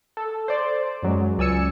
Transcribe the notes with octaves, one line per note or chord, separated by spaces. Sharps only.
A4
C5 D5
F#2 F#3 G#3
C#2 D5 G#5 E6 C#7